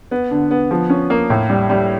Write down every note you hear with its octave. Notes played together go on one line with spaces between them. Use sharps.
B3
D3
B3
F3
C#4
A#3
A2
G3
G3